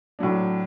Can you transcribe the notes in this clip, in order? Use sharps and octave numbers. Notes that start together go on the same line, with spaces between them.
A2 F#3 D4